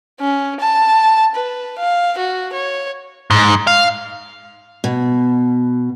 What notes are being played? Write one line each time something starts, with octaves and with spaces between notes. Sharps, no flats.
C#4
A5
B4
F5
F#4
C#5
G#2
F5
B2